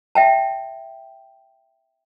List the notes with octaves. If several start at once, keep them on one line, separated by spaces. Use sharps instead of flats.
E5 G5 A5